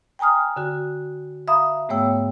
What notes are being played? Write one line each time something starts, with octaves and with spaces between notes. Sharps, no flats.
G5 G#5 A#5 D#6 F6
D3 F#4
E5 F5 A#5 B5 D#6
G#2 A3 B3 C#5 G5 E6